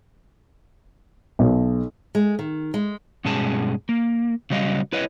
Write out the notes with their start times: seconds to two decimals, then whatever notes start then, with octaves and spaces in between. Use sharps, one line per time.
1.39 B1
2.15 G#3
2.39 D#3
2.74 G#3
3.25 G2 B2 G#3 C#4 G#4 A5
3.89 A#3
4.50 C#3 F#3 G3 D#5 F5
4.93 E4 B4 C#5 D#5